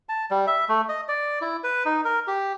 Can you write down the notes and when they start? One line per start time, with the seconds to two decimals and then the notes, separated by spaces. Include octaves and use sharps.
0.09 A5
0.31 G3
0.47 E5
0.69 A3
0.89 D#5
1.08 D5
1.41 E4
1.64 B4
1.85 D#4
2.05 A#4
2.28 G4